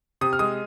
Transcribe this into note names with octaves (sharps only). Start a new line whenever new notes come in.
C3 D#6
F6
G#3 D#6